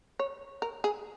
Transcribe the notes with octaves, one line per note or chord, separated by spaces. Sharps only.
C#5
A#4
G#4